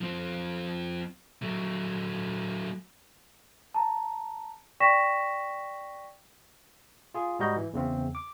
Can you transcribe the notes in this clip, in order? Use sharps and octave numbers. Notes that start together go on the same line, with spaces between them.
F3 C4
F#3 A3
A5 A#5
D5 G5 C#6 A#6 B6 E7
F4 G#4
G#2 G3 D#4 F#4 D#5 G6
E3
E2 C#3 C4
D6